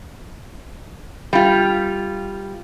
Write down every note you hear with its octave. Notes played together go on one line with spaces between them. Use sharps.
G3 F4